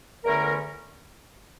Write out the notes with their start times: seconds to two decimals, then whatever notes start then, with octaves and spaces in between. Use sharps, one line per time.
0.25 E2 D3 A3 C#4 E4 A#4